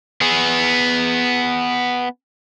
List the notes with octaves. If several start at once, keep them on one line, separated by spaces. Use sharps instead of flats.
B3 G#4